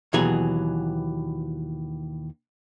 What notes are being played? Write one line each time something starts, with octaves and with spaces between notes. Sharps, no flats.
D#2 B2 E3 F#3 G#4 G#5